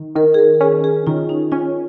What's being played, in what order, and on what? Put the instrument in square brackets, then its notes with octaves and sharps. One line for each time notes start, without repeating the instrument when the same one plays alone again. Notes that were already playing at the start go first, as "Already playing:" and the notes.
Already playing: [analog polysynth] D#3
[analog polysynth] D#3 [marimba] A#4
[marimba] G#4
A#4
[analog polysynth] C#4 [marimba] G#4
[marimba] G#4
[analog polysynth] D#3 [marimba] F4
[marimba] D#4
[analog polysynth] C#4 [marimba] F4